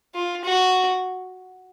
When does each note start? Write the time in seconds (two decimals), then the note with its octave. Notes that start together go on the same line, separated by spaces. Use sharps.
0.15 F4
0.44 F#4